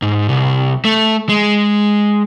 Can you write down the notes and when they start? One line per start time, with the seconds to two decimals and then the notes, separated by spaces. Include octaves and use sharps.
0.02 G#2
0.29 C2
0.85 A3
1.29 G#3